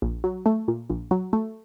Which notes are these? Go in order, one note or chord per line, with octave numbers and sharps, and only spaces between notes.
A#1
F#3
A3
A#2
A#1
F#3
A3